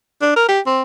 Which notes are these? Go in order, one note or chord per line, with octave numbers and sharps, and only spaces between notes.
D4
A#4
G4
C4